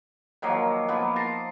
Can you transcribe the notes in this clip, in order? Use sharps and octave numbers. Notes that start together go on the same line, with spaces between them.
D#3 F3 F#3 A#3
F3 A#3 B3
A5 A#5 C6